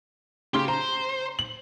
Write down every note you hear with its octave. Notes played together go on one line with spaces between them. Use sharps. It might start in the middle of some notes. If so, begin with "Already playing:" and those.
C#3 G4 C6 G7
C5 A#5
F#7